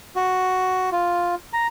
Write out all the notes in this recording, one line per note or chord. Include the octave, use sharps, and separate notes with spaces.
F#4
F4
A#5